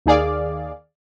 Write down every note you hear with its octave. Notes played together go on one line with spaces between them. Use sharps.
D#2 D#3 G#4 D5 F5